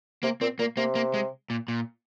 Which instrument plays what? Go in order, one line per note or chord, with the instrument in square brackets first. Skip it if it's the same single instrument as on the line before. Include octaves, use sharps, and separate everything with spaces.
[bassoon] C3 [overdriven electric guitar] A#3
[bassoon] A#2 [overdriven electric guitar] C4
[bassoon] A#2 [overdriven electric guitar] A#3
[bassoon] C3 [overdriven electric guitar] A#3
[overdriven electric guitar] A#3
G#3
A#2
A#2